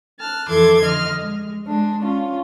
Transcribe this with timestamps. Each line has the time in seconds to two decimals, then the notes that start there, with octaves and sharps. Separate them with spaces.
0.19 A5 F6 F#6
0.48 F2 E3 A4 C6 D6 G#6
0.83 D3 D#5 F6
1.19 G#3
1.67 G#3 D4
2.03 C#4 F4